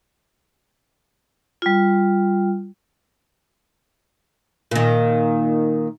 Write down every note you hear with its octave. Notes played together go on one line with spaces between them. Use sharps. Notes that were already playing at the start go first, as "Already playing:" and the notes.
G3 F4
A#2 D#3